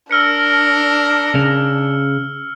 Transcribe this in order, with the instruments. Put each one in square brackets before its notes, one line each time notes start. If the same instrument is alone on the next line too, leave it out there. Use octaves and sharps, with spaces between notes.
[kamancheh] D4 [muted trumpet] A#4 [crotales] E6 F6 C#7
[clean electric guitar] C#3